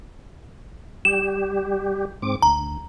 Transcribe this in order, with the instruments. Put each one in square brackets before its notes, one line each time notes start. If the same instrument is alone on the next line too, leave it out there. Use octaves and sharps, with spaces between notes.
[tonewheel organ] G3 G4 [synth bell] E7
[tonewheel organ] G#2 C4 D6
[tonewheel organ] D2 [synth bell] A#5